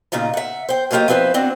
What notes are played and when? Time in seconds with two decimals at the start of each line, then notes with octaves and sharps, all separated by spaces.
0.12 A#2 C#3 D#4 F4 A#5
0.34 E5 F#5
0.69 C5 G5
0.91 F#3 G3 A#3 F4 G4 D#5
1.08 F3 C4 E4 B4 C5
1.34 B3 C4 D4 F#4